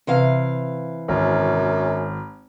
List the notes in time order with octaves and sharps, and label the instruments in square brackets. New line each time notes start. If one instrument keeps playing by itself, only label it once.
[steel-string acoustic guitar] C3 E3 F5
[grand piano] G#1 [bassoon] F#2